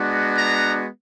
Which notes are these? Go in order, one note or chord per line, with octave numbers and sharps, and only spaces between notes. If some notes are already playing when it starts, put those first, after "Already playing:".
Already playing: G#3 B3 D4 F#4
A#5